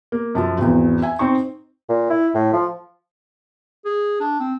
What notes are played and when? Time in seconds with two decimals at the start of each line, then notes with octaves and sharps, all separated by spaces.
0.12 A#3
0.35 F#2 F3 A4
0.58 G#1 E2
1.02 E5 G#5
1.19 C4 D#4 C5 C#6
1.89 A#2
2.10 E4
2.35 A2
2.53 F3
3.85 G#4
4.20 D4
4.40 C4